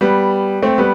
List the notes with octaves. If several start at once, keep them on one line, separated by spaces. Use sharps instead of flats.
G3 B3
A3 C4
G3 B3